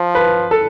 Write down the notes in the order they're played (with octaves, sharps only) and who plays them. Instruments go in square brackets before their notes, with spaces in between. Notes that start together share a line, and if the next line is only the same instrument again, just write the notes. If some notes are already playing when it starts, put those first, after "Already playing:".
Already playing: [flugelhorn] F3
[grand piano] B4
A4